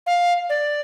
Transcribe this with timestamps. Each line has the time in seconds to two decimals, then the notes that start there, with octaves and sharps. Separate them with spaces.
0.07 F5
0.49 D5